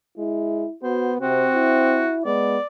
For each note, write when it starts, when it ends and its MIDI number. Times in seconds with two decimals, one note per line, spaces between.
0.18 0.65 56
0.18 0.75 64
0.83 1.20 59
0.83 1.12 66
0.83 1.14 72
1.21 1.49 48
1.21 2.06 60
1.21 2.17 66
1.54 2.22 64
2.25 2.57 56
2.25 2.58 59
2.25 2.66 74